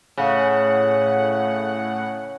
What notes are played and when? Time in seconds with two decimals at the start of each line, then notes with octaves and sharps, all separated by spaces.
0.17 A2 C#3 F#5